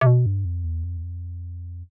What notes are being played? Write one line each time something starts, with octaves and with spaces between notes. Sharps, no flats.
C3
B2
G2
F2
E2
F2
E2
F2